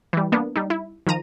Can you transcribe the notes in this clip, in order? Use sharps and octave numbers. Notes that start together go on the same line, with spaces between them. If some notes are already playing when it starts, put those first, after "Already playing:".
E3 G3
A#3 B3 D4
G3 D#4
E4
D#3 F3 A#5 D#7